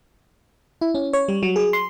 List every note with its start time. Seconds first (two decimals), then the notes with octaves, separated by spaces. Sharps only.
0.81 E4
0.95 C#4
1.13 C#5
1.28 G3
1.43 F#3
1.56 G#4
1.73 C6